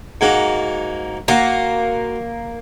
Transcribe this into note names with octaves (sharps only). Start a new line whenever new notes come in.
G#2 A#3 F#4
A#3 F4 F#4